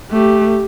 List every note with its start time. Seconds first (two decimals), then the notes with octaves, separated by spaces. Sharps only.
0.11 A3 G4